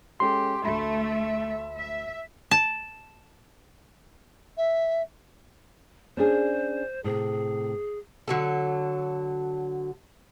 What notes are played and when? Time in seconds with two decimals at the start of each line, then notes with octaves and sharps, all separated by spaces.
0.20 G#3 C#4 G4 A4 C6
0.65 D2 A3 E5 B5
1.79 E5
2.51 A5
4.57 E5
6.17 C#4 D4 G#4 C5
7.04 A2 C3 G#4
8.28 D3 F#3 A4